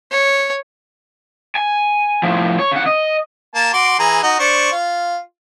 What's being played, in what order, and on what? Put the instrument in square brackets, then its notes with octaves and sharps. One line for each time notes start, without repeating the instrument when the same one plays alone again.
[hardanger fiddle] C#5
[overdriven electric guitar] G#5
A2 F3
C#5
C#3 F#5
D#5
[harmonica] A#3 A5
F#4 C6 D6
E3 G#4 A#5
D#4 F#4
D4 C5 C#6
F4